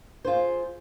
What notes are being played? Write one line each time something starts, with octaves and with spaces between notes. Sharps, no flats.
F4 G#4 C5